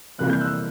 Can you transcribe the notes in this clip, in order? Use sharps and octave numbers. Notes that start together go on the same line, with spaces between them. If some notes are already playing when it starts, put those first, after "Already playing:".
F2 C3 E3 G3 A#3 F#6
G6
E6 F#6